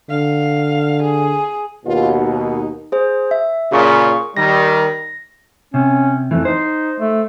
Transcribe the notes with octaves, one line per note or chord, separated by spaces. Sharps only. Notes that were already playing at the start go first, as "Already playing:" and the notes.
D3 F5
G#4
D#2 B2 F4
D#4
G#4 C5
E5
A#2 C#3 G#4 C#6
D#3 G3 A#6
C3 C#4
F2 E3 A3
D#4 C5
A3